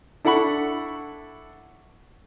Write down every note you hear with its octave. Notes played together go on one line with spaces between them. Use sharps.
D4 E4 A4 F#5 B5 C#6